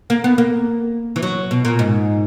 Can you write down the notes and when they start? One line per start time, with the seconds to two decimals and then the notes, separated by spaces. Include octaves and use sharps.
0.10 A#3
0.24 B3
0.38 A#3
1.16 E3
1.22 F#3
1.51 B2
1.65 A#2
1.79 G#2